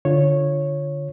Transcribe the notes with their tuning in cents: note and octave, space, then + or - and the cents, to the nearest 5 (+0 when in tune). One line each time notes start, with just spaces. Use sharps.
D3 +0 F4 -10 C#5 -10